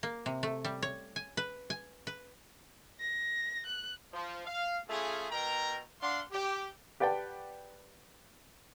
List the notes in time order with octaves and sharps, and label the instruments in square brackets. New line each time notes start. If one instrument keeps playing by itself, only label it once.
[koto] A#3
C3
A3
G3
C#5
G#5
B4
G#5
B4
[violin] A#6
F#6
[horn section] F3
F5
A3 C#4 F4 G#4
B2 A#4 G5 A#5
D4 F5 F#5 C6
G4
[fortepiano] G4 B4 D5 F#5 G5 A5